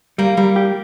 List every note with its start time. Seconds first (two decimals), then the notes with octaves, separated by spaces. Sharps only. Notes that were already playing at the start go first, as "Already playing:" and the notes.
0.18 G3 A#3
0.37 G3 A#3
0.56 G4